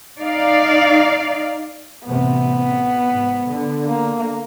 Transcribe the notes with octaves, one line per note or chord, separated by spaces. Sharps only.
D#4 D5 F5
A1 C3 B3
G#2
D3
A#3